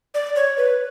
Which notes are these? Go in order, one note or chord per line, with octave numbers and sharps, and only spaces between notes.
D5
C#5
B4